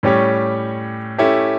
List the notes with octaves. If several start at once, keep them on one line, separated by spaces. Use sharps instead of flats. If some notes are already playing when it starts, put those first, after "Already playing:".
A2 G3 C#4 G4 C#5
A3 C#4 E4 G4